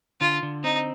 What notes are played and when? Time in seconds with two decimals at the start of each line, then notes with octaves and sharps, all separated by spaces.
0.21 D3 F4
0.43 D3
0.64 C4 D#4